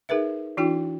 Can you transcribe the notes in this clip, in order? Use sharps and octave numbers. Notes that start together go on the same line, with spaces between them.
D#4 G#4 A#4 B4 E5
E3 D4 E4 F#4 G5